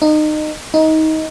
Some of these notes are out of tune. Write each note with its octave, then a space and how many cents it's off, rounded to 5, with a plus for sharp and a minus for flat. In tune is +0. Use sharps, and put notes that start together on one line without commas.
D#4 -25
D#4 +20